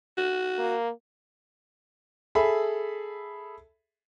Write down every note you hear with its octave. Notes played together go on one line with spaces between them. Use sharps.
F#4
A#3
G#4 A4 E5 B5